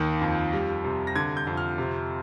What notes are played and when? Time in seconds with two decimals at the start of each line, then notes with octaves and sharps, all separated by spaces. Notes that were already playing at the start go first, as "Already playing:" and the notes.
Already playing: D#2 D#3
0.21 F2
0.53 G3
0.84 C3
1.07 A#6
1.16 D3 G#6
1.37 G6
1.47 F2
1.57 F6
1.78 C3